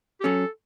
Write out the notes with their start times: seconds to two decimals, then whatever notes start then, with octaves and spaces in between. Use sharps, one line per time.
0.21 G4
0.24 F#3 C#4 F#4 A4